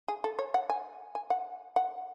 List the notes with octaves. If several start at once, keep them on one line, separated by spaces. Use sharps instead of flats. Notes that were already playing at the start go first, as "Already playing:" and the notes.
G#4
A4
C#5
F#5
G#5
G#5
F#5
F#5